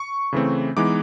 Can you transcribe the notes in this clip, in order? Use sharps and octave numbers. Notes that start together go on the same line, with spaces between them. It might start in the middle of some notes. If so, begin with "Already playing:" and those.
Already playing: C#6
C#3 E3 A3 C4
E3 G#3 B3 D#4 D6